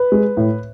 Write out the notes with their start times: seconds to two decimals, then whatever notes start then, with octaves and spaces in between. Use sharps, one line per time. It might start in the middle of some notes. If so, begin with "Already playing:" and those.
Already playing: B4
0.12 G#3
0.37 A2